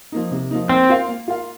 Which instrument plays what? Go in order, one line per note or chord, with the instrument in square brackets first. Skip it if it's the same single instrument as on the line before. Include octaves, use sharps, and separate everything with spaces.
[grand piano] F3 A#3 D#4
C3
F3 A#3 D#4
[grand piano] A#3 [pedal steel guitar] C4
[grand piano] F4 A#4 F5
A#3
F4 A#4 F5